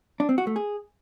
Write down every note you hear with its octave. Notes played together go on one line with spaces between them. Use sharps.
D4
C4
F#4
A3
G#4